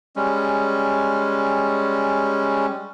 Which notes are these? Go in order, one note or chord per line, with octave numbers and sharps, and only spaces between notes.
G3 G#3 C#4